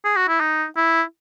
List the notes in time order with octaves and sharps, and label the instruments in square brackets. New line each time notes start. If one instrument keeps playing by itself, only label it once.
[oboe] G#4
F#4
E4
D#4
E4